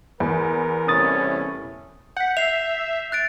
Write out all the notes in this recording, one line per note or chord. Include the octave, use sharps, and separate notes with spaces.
E2 A#4
C2 A2 C#4 D#6 A6
F#5 G6 B6
E5 C7 F7
F#6 A6 D7